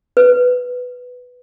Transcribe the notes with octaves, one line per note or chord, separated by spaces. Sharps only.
B4